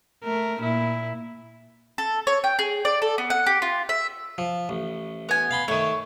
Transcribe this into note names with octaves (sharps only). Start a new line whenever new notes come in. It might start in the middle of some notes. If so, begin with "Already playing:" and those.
A3 A#4
A#2 E4
A4
C#5
G5
G#4
D5
A4
B3
F#5
G4
F4
E5
F3
A1
B3 G#5
F5 B5 C6
D#3 A3 C#5